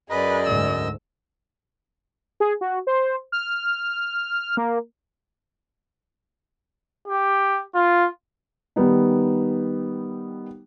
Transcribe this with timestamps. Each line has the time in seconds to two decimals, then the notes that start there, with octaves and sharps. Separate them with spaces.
0.10 F#2 G#4 B4 D5 D#5
0.46 D2 G#2 E6
2.40 G#4
2.61 F#4
2.87 C5
3.32 F6
4.57 A#3
7.08 G4
7.75 F4
8.76 D#3 G3 B3 D#4